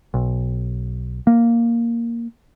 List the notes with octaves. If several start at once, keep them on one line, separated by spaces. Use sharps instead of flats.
B1
A#3